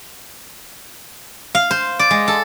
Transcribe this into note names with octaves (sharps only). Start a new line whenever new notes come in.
F5
C5
D5
G#3
A4